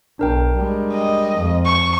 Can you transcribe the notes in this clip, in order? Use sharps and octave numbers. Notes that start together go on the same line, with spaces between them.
B1 D4 A#4 G5
G3 G#3
D#5
F2
C#6